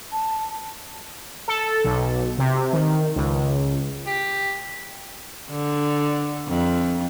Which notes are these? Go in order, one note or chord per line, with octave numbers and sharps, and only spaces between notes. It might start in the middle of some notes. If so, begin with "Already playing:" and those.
A5
A4
B1
C3
D#3
C#2
G4
D3
F2